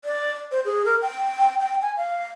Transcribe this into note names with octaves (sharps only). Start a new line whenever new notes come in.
D5
C5
G#4
A#4
G5
G5
G#5
F5